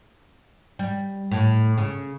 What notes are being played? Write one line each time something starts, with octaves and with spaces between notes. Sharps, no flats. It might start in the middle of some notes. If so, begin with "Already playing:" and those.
G3
A2
C#3